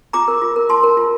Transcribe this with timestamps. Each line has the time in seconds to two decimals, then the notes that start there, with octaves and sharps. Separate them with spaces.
0.13 F4 A#5 D6
0.28 A#4
0.42 F4
0.56 A#4
0.69 F4 A5 C6
0.83 A#4
0.97 F4